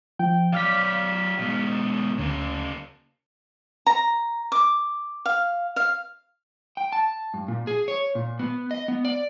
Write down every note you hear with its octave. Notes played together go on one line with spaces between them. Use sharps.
F3 G5
F#3 D5 F5 F6 B6
G#2 B2
D2 C#3 A#3
A#5
D6
F5
F5
G5
A5
G2
A#2
G#4
C#5
A#2
B3
D#5
B3
D5